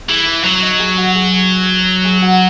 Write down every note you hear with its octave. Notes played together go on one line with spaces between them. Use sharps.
E3 G#4
B4
F#3 C#4 C#5
D#4 D#5
G#4 G#5
F#4 F#5
G#4 G#5
G#4 G#5
F#4 F#5